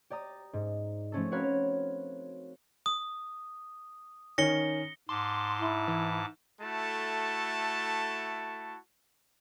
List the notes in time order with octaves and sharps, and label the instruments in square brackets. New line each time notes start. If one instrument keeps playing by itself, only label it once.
[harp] G4 D5 A#5 D#6
G#2
F3 A3 C#4 A4
C4 F#4 A#4 B4 C#5 F5
[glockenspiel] D#6
[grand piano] D#3 C#4 [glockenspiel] A#6 C#7 G7
[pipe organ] G#2 A5 D6 [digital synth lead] C6
[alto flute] E4
[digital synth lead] E3
[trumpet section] A3 E4 F#4 A4 A5